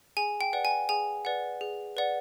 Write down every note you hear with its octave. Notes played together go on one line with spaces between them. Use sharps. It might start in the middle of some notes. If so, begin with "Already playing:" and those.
G#4 G#5
G5
B4 D5 F#5
G#5
G#4 G#5
B4 D5 F#5
G#4
B4 D5 F#5